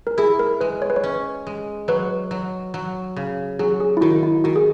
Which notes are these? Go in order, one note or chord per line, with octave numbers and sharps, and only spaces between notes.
A#4
E4 G#4
A#4
G#3 B4
C#5
B4
C#5
C#4
G#3
F#3 B4
F#3
F#3
C#3
F#3 G#4
G#4
E4
D#3 F#4
E4
D#3 F#4
G#4